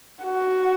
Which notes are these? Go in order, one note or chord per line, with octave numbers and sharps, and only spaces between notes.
F#4